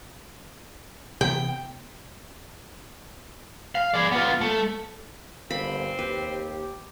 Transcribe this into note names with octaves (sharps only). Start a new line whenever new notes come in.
C3 E3 B3 G5
F5
G#4 D5
B3 F4
A3
G1 A#3 C4 B5
D#2 G4 B4